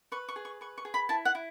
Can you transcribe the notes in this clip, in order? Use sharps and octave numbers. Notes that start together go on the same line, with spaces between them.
B4 C#6
C#6
G#4
C#6
B4 C#6
C#6
G#4
B5
E4 A5
F#5
E4